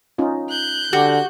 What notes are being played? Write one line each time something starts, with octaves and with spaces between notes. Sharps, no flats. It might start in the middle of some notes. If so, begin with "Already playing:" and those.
C#4 D#4 F4
F#6 G6
D3 F#4 G4